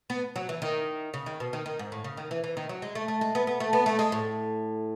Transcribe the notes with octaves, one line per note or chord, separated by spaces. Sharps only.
B3
F#3
E3
D#3
C#3
D#3
B2
D#3
D#3
G#2
A2
C#3
D#3
E3
E3
D#3
F#3
G#3
A3
A3
G#3
B3
B3
A3
B3
A3
G#3
A2